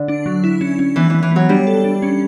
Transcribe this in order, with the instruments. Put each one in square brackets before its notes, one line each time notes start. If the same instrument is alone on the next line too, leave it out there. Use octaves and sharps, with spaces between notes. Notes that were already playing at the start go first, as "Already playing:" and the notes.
Already playing: [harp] D3
[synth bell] D4
F#3
E4
C#4
C#4
[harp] E3 [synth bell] B3
[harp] E3 [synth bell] B3
[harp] E3
[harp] F#3 [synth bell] B3
[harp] G3 [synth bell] D4
[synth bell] A4
D4
C#4